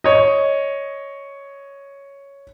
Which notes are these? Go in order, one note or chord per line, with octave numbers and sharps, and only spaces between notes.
C#5 D#5